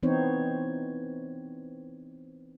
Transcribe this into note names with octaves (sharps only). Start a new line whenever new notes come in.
E3 B3 C4 D#4 C5 C#5